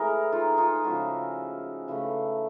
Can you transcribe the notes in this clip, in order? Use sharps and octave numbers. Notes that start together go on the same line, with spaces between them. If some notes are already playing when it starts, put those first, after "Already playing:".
Already playing: A2 E3 G#3 G#4 A#4
D#4 F4
D#4 F4
C#3 F3 G#3 E4 F#4
C#3 E3 A3